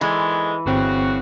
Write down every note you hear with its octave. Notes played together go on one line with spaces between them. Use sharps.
G#2 D3 E3 G#3
G1 C#3 G#3 C4 F#4